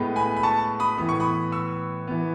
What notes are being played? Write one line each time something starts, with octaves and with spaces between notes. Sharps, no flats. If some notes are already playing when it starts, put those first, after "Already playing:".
Already playing: A2 G#3 B3
G#5 B5
B5
A5 C#6
B5 D#6
A2 E3 B3 D#6
C#6
B5 D#6
C#6 E6
E3 B3